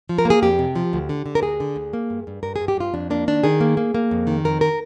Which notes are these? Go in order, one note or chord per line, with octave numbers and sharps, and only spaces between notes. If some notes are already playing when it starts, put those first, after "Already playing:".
F3
A#4
A#3
G#4
F2 G4
C3
F3
D2
D3
D3
A#4
D2 G#4
D3
D2
A#3
G2
G2
G2 A#4
G#4
G2
G4
G2 F4
F2 D4
A#3 D4
D#3 D4
D#3 G#4
A#3
A#3
A#3
F2
D#3
F2 A#4
A#4